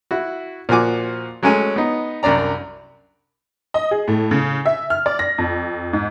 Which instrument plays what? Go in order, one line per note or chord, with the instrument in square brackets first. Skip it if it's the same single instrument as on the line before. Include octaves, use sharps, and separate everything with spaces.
[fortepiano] E4 F#4
A#2 F3 F#4 G#5 D6
F#3 G#3 A3 C#4 G#5
B3 D#4
C2 F#2 D4 D5 A#5
[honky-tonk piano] D#5
G#4
A2
C#3
E5
F6
D5
A#6
F2
G#2